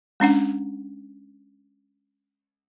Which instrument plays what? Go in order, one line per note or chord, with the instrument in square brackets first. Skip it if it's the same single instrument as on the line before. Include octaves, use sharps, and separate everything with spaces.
[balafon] G#3 C#4 D4 F#5